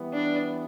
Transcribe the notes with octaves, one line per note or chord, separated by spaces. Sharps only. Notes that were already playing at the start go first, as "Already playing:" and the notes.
Already playing: E3 G3 B3
D4